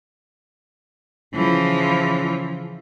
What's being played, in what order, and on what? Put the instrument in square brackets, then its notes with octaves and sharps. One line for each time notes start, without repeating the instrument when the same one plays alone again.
[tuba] C#3 [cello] E3 F3